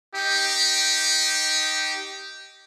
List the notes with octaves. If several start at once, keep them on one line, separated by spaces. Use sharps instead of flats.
D#4 G4